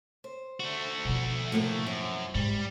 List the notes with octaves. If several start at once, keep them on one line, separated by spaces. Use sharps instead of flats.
C5
A3 F#4
B2 F3
A2 C3 A#3
F#2 C4
G#2 G3